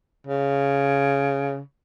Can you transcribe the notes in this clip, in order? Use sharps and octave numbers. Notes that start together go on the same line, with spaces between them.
C#3